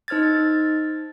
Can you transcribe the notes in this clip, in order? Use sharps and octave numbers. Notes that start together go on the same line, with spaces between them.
D#4 C5 F6 G#6 A6